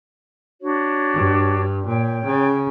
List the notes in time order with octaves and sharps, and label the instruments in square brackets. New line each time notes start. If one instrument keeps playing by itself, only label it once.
[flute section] D4 F#4 C#5
[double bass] G2
[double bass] A#2 [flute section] C#5 G5
[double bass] C#3